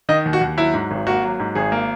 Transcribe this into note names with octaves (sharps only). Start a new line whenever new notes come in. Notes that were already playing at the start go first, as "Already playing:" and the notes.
D#3 D#5
D#2
F#4
D#2
F#3 E4
G#2
G#1
A#3 F#4
F#3
G#2
G#1 G#4
A#3